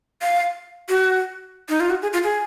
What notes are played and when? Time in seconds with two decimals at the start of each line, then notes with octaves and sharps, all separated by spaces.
0.22 F5
0.89 F#4
1.69 D#4
1.80 F4
1.90 F#4
2.02 G#4
2.13 F4
2.24 G#4